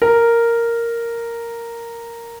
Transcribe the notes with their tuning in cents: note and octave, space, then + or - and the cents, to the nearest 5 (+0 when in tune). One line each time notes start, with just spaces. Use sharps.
A#4 -5